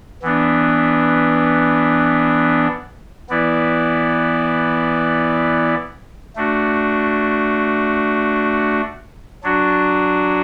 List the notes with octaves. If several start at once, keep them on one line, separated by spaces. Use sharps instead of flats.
E3 B3 D4
E3 B3 E4 D5
A3 D4 F#4
F#3 D4 F#4